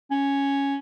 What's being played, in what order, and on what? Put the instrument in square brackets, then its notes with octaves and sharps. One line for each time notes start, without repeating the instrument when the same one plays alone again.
[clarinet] C#4